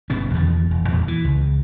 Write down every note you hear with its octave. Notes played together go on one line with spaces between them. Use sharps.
G1 B2 B3 C#4
E2 D#3 F3
E1
E2 A#2
E3
C#2